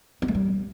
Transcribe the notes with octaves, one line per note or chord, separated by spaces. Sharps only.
C4
A3
G3